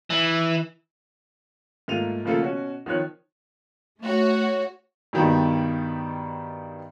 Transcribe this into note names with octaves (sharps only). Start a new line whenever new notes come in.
E3
G#2 A3 A#3 F4 D#7 F7
C#3 F3 A3 A#3 F4 A4
B2 C#4 F#4
D#3 F3 C#5 F#6
A3 F#4 C#5
G2 B2 D#3 G3 B3